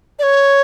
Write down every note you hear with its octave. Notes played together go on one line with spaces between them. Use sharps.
D5
C#5